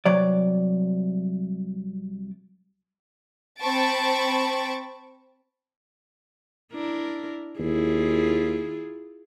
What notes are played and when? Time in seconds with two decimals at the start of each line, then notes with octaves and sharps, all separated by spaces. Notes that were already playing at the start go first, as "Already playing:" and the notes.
0.06 C2 F#3 D5
3.59 C4 A5 B5 C#6 A6 D7
6.72 D4 E4 A#4
7.60 D#2 E4 F4 G#4